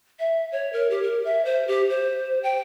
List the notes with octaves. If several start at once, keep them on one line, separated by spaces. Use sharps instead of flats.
E5
C#5
A#4
G4
A#4
E5
C5
G4
C5
G5